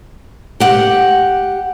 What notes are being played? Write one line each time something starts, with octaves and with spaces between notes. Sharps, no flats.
G4 F#5